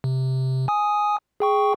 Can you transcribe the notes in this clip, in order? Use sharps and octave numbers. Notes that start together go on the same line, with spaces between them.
C3
G#5 D#6
G#4 G5 C#6